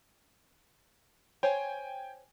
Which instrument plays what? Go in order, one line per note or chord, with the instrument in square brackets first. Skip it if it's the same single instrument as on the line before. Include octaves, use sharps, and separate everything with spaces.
[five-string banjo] C5 C#5 [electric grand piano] G5 G#5